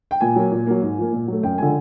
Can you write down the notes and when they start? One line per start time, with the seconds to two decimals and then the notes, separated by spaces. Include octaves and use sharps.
0.11 G5
0.21 A#2 G#5
0.36 F#3 A#3
0.52 A#2
0.67 F#3 A#3
0.82 G#2
0.98 F3 A#3
1.13 A#2
1.28 F#3 A3
1.43 F#2 G5
1.58 D3 F3 G#3 G#5